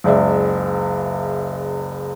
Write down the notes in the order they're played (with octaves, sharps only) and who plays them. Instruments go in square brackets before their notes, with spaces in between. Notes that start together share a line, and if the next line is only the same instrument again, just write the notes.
[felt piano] F#1 C#2 D5 E5